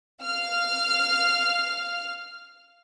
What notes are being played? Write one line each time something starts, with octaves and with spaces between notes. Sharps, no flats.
F5 F6